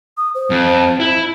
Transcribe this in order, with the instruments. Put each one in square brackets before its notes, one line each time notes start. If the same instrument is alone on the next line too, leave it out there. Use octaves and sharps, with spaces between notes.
[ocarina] D#6
C5
[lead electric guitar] F2
E4